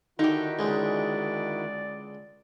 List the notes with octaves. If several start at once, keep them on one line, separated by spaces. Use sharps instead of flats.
D3 D#3 D#4 E4 F#4 G4
C#2 D3 G#3 D5